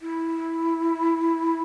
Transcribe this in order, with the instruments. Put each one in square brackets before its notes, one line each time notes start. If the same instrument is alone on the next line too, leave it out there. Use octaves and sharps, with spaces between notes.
[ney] E4